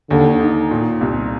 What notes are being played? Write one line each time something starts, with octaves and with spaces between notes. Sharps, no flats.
D#2 D3
D#4
A#2
C2